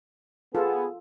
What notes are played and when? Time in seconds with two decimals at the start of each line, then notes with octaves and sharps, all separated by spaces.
0.55 B3 F4 G#4 A4